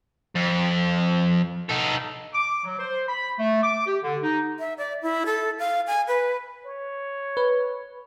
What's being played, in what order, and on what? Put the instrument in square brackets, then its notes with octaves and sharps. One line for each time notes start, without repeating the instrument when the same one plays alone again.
[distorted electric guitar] F2
D#4 A4
[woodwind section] D6
F#3
C5
B5
A3
D6
G4
D3
D#4
[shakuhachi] E5
D5
E4
A4
F5
G#5
B4
[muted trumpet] C#5
[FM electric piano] B4